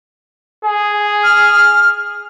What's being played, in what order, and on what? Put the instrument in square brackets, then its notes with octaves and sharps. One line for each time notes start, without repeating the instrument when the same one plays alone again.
[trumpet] G#4
[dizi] F6